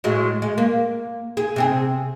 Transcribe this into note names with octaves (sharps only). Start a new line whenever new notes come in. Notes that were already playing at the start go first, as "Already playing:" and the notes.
A2 F#3 G#3
G#3
A#3
G#4
C3 C4 G#4